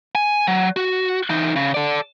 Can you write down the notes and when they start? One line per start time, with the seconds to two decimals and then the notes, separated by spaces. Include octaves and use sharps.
0.15 G#5
0.48 F#3
0.76 F#4
1.30 E3 D#4
1.56 C#3
1.74 A4 D5